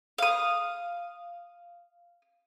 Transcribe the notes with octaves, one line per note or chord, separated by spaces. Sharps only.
F5 D#6